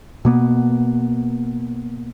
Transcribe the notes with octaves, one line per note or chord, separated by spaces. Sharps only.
B2 A#3 B3